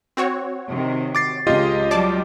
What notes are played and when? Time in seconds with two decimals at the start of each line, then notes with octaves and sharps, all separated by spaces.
0.17 C4 F#4 C#5
0.68 C3 D#3
1.15 D6 A6 C7
1.47 C#2 F4 G4 D#5
1.91 F#3 G3 D5 A5 D6